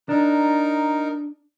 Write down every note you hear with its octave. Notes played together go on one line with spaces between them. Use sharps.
D4 D#4 A#4